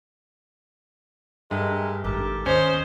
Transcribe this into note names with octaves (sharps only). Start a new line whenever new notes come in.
G2 G#3 A3 A#4
G#1 G4 A4 A#4
D#2 C#4 C5 D#5